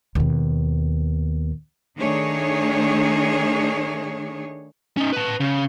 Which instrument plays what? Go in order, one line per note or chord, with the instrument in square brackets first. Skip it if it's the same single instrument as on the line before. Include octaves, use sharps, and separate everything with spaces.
[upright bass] D#2 B2
[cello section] D#3 A3 D4 D#4 G#4 C#5
[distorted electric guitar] C#4 D#4
B4 A5
C#3